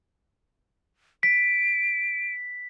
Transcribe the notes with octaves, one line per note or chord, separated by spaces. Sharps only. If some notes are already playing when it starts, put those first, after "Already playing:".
B6 D7